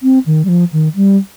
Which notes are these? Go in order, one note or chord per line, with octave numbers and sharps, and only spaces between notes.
C4
D#3
G3
F3
D#3
G3